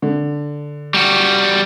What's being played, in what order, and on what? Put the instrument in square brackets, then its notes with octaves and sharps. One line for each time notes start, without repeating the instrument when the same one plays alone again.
[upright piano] D3
[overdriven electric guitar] G3 F#4